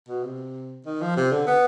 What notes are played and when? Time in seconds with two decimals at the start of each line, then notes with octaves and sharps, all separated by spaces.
0.08 B2
0.23 C3
0.86 D#3
1.01 F3
1.17 C3
1.32 D3
1.47 B3